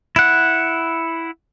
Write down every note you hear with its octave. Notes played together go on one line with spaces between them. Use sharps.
E4 F#5